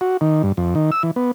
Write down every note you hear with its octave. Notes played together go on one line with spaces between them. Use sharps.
F#4
D#3
G2
F2
D#3
E6
E3
B3